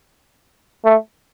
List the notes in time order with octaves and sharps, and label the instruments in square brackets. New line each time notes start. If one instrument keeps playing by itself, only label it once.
[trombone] A3